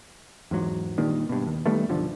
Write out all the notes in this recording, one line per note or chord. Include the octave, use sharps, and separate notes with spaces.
E2 G#2 F#3
G2 A#2 D#3
G2 B2
D#2
D#3 G3 A3 B3
B1 G2 D3 F3